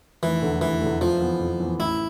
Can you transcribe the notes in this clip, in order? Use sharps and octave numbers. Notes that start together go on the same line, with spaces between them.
F1 E3
E2 D3 A3
F1 E3
E2 D3 A3
F2 F3
E3 B3
F2
E3 B3
A1 E4